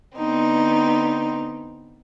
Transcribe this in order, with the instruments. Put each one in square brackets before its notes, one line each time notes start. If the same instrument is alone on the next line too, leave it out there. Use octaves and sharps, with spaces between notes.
[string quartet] D3 B3 C4 D#4